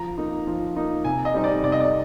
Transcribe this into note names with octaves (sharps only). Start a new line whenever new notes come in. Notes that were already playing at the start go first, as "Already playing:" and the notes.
Already playing: F3 A#5
A#3 D#4
F3
A#3 D#4
C3 G#5
D#5
G3 C4 D#4
D5
C3 D5
D#5
D5